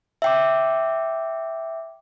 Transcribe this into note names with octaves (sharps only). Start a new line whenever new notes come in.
E5 G5 D6